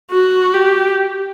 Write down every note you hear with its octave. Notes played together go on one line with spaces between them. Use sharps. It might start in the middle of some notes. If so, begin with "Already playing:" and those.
F#4
G4